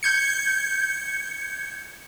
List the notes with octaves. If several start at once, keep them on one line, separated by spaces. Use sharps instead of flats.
G6 G#6 C#7